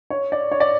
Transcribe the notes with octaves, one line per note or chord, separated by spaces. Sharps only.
C#5
D5
C#5
D5